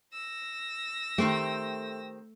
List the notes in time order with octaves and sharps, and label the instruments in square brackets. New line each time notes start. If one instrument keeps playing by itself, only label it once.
[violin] E6 A#6
[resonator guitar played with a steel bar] D#3 C4 G4 [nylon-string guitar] A3